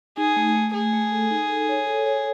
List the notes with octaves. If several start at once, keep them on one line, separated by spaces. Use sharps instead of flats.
D#4 G#4
A3
A3
A3 G#4
A3
A4
D#4
A4
C#5
A4
C#5